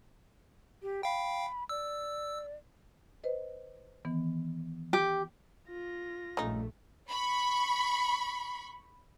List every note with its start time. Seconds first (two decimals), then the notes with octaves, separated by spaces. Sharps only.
0.82 G4
1.03 F5 G5 B5
1.69 D5 E6
3.24 B4 C5 D#5
4.05 D#3 E3 B3
4.93 G4
5.68 F4 A#6
6.37 A#1 G2 C#3 A3 D#4
7.09 B5 C#6